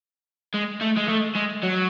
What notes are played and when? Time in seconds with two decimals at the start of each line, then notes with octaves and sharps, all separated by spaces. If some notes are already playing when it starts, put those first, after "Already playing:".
0.54 G#3
0.81 A3
0.97 G#3
1.09 A3
1.36 G#3
1.63 F#3